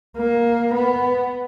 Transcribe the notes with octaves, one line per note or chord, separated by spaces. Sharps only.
A#3
B3